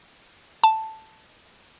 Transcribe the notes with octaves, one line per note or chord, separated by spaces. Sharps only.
A5